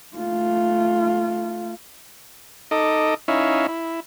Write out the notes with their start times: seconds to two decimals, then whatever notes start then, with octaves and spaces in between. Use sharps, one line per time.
0.16 A3 F4
2.71 D#4 A4 D#5 D6
3.28 C#4 D#4 E4 C#5 E5 F5
3.68 E4